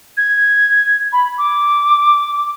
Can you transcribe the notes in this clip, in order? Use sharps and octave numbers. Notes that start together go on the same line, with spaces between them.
G#6
B5
D6